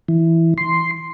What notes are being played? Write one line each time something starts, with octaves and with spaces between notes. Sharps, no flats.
E3
C6